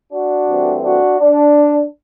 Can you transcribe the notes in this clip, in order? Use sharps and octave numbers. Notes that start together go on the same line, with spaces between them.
D4 F#4
G2 E3 A3 C4
D4 F#4
D4